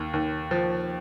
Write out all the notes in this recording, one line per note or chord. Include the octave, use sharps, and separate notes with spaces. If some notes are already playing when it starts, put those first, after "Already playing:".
Already playing: D#2
D#2
F3